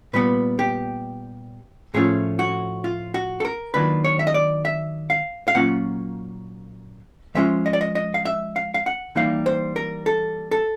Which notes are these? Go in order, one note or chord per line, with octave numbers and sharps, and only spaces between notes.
A#2 G3 B3 B4
G4
A2 F3 A3 C#4 F4 G#4
F#4
F4
F#4
A4
A#4
D#3 F#3 A#3 D4 F4 B4
C#5
E5
D#5
D5
E5
F5
F5
A#2 F#3 A#3 C#4 F4 F#5
F3 G#3 C#4 F4 E5
D#5
D5
D#5
D#5
F5
E5
F5
F5
F#5
E3 G3 A#3 D#4 F5
C5
A#4
A4
A4